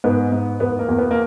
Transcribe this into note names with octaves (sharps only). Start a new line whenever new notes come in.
G#2 B3
G#2
E2 B3
A#3
E2
B3
A#3